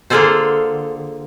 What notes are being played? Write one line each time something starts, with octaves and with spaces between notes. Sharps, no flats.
D3 A#3 F4 G#4 A4 C5